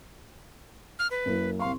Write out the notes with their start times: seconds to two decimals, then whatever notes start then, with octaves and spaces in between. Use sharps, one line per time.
0.99 F6
1.11 B4
1.26 F#2 A#3 E4
1.60 C2 F5 C6 C#6